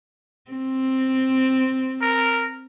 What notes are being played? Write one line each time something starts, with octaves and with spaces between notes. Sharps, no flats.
C4
A#4